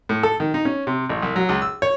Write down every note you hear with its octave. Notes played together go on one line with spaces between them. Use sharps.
A2
A4
D#3
D#4
C#4
C3
A1
C2
F#3
C#2
E6
C#5